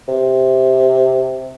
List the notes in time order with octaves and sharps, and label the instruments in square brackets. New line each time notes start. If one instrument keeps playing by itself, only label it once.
[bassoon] C3